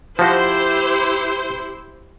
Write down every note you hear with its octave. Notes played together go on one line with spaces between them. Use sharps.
F3 E4 F#4 G4 C5